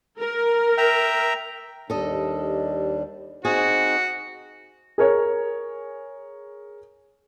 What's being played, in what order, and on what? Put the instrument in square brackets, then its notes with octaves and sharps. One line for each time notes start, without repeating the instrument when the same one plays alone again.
[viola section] A#4
[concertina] E5 G5 A#5
[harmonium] D#2 G3 D4 [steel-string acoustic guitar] A4 D#5
[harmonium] C4 D#4 C5 [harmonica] F#4 [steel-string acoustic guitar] G#4
[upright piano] G#4 A#4 C#5